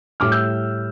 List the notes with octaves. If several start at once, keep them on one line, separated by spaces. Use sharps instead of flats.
A2 G3 D6 F6
E6 G6